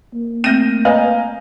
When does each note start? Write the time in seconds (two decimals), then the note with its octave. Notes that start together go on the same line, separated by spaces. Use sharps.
0.14 A#3
0.44 A3 C4 G6 A#6 D#7
0.85 B4 D#5 F5 G#5 A#5